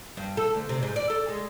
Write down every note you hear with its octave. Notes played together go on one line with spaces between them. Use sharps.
G2
A4
D2
C3
G#2
D5
A4
G#3